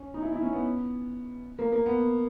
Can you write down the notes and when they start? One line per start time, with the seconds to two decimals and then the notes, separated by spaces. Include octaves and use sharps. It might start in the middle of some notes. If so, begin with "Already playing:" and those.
Already playing: C#4
0.14 D#4
0.22 E4
0.32 E4
0.43 C#4
0.53 B3
1.59 A#3
1.72 A#3
1.86 B3